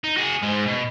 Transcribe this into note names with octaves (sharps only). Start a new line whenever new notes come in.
D#4
F#4 G#4
G#2 G#3
B2